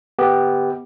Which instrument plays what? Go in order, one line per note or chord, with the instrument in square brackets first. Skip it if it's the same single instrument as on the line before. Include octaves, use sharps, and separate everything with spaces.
[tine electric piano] B3 G4